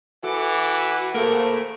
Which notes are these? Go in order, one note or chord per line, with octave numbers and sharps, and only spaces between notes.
E3 F#4 A4 D6
A3 A#3 G#4 A#4 C5